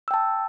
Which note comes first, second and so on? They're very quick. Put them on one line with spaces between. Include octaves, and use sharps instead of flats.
E6 G5 A5